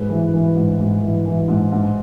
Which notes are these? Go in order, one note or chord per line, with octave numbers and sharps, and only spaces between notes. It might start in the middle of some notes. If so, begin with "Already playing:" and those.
Already playing: G#2 G#4 B4
E3
E3
G#2
G#2
E3
E3
G#2
G#2